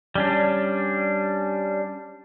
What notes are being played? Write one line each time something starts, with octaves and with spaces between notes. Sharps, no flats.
G3 C#4 D4